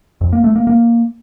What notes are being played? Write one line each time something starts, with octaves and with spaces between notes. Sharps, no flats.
F2
A#3
A3
A#3
A#3